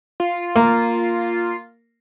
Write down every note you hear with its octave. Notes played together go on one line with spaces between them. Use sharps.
F4
A#3